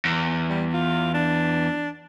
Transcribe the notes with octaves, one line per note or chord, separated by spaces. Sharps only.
E2
G3
F4
D4